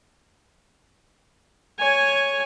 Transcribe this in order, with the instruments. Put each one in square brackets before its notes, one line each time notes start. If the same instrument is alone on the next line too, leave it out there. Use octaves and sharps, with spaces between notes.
[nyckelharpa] C#5 G#5